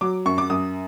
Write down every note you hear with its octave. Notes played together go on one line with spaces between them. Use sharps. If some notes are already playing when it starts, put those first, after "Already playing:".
F#3 D6
F#2 C#6
D6
F#2 D#6